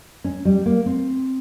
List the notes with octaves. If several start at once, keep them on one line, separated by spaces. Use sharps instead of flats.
C#4
G3
A#3
C4